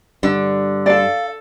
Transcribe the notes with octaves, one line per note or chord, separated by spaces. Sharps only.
G2 D3
A4 D5 F5